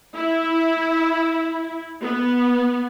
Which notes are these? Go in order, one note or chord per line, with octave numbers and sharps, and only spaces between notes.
E4
B3